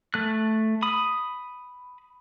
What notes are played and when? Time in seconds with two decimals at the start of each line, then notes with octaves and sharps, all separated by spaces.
0.14 A3 F#6
0.82 B5 D#6